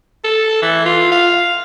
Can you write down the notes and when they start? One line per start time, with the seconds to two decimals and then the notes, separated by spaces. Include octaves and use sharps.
0.24 A4
0.62 E3
0.85 F4
1.12 F5